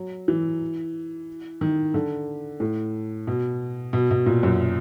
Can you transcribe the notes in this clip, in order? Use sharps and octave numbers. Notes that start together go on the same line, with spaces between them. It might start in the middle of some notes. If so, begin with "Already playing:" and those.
Already playing: F#3
E3
D#3
D3
A2
B2
B2
B2
A#2
F#2